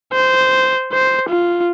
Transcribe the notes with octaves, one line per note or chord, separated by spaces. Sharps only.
C5
C5
F4